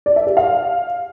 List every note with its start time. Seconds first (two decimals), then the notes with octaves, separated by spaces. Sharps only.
0.06 D5
0.16 E5
0.27 G4
0.37 F5